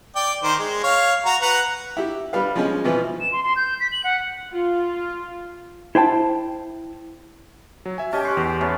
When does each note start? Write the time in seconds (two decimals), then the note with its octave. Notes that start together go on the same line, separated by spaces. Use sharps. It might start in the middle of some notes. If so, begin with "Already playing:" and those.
0.16 D5 G5
0.43 D#3 C5
0.59 G#3
0.84 C#5 F5
1.25 F#4 A#5
1.42 B4 F#5 A#5
1.97 E4 G4
2.33 G3 B4 F5
2.56 F3 G#3 C#4
2.84 B2 E3 F3 B3
3.21 E7
3.32 C6
3.43 C6
3.56 G6
3.80 B6
3.92 F#7
4.04 F#5
4.52 F4
5.95 E4 C5 G5 A5
7.86 F#3
7.98 E5 G#5
8.13 C#4 G4 D#5 A5
8.25 C6 C#6 F#6
8.37 E2
8.61 A3 B3 C#4